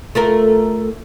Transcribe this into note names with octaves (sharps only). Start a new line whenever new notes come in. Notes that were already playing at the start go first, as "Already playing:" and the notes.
A3 F4 A#4